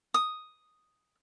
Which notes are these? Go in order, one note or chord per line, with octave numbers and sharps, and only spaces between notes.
D#6